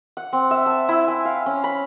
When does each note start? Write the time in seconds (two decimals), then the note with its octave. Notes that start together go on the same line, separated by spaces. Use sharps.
0.17 F#5
0.33 C4
0.51 E5
0.66 A5
0.89 E4
1.08 G#5
1.25 F5
1.46 C#4
1.64 B5